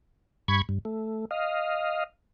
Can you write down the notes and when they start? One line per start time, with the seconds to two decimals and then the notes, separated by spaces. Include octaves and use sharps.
0.48 G2 B5 C#6 G#6
0.69 G2
0.85 A3
1.31 D#5 F5